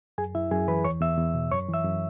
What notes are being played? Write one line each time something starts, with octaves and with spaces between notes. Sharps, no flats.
F#2 G#4 G#5
F#2 E4 E5
F#2 G#4 G#5
E3 B4 B5
E2 C#5 C#6
E2 E5 E6
E2
B2
F#2 C#5 C#6
E3
E5 E6
F#2